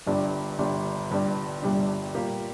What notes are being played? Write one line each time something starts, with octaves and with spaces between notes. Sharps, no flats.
G1 G2 G3 D4
G1 G2 G3 D4
G1 G2 G3 D4
G1 G2 G3 D4
A#2 G3 A#3 G4